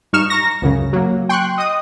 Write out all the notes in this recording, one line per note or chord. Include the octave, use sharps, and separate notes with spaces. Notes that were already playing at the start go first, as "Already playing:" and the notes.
G2 D#4 C#6 F6 E7
A#5 C#6 A#6
C#2 F#2 C#3
F#3 A#3
G5 C6 C#6 F#6
D#5 D#6